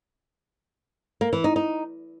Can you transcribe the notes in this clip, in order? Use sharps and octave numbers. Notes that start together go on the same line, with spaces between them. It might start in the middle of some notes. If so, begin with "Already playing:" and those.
A#3
E3
D#4
D#4